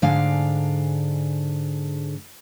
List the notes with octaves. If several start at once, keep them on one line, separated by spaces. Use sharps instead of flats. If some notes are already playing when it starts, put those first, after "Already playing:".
G#2 D3 G#3 D4 F5